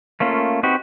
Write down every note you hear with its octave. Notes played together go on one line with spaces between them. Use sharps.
A3 A#3 C#4 F4
C4 D#4 F#4 G4 B4